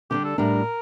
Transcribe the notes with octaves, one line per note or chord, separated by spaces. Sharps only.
D3 G3 D4 G4
A4
A2 G3 D4 A#4